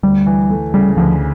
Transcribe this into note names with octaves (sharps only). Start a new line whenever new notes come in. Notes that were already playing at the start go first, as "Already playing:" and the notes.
D2 G3
E3
A3
C#3 G3
D2 F3